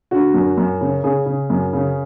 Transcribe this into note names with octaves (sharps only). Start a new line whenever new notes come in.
D3 F#4
F#2
F#2
C#3
C#3 G#4
C#3
F#2
C#3